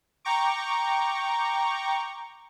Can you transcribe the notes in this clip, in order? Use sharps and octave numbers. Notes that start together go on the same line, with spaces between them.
G5 A#5 C#6 D6